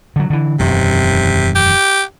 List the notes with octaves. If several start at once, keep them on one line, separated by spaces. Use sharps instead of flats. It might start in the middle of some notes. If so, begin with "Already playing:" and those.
D3 F#3
D3 E3
E1 F#2 C3 D#3
G4